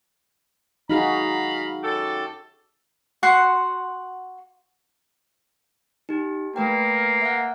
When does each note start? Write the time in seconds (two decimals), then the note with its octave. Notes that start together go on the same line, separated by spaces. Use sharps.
0.90 D#4 F#4 G#4 F5 A#5 B5
1.83 F#2 G4 A4
3.23 F#4 F#5 C6
6.09 D#4 G4
6.56 A3 A#3 B4 G5
7.22 E5 F#5